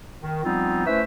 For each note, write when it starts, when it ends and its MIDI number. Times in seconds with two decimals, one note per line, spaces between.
0.22 0.39 51
0.44 0.85 53
0.44 0.85 55
0.44 0.85 59
0.44 0.85 60
0.44 0.85 63
0.44 0.85 65
0.86 1.01 57
0.86 1.01 61
0.86 1.01 64
0.86 1.01 71
0.86 1.01 72
0.86 1.01 76